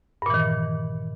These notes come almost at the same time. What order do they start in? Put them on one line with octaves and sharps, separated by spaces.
G2 A#2 E3 D#3